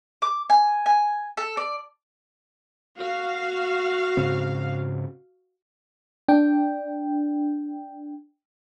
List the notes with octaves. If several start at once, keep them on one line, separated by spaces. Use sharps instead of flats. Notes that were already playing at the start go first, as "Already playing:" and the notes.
D6
G#5
G#5
A4
D5
F#4 F5
G#2 C#3 C4
D4 G5